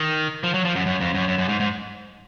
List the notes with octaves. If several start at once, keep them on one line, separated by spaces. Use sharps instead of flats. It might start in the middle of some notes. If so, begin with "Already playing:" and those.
Already playing: D#3
F3
F#3
F3
F#2
F#2
F2
F#2
F#2
F#2
G#2
G#2